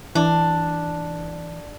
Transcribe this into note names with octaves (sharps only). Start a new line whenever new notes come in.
E3 D4